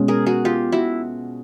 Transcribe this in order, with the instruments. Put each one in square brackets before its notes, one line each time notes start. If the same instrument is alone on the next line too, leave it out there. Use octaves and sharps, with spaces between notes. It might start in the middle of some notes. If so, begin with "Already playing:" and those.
Already playing: [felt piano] B2 G#3 C#4
[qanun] G#4 A#4
F#4 G#4
F4 G4
E4 F#4